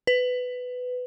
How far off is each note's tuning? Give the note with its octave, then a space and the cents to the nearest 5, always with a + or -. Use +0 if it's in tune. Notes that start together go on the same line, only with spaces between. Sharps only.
B4 +15